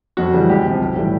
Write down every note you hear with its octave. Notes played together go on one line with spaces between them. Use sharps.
F2 F#4
C#3 E3 G3
C#2 G4
C3 F3
B1
A2 E3 G3